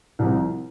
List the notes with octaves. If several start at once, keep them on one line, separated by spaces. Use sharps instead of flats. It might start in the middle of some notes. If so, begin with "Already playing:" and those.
C2 C3 F3